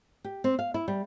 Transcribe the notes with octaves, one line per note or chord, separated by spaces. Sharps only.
G4
C4
F5
E4
G3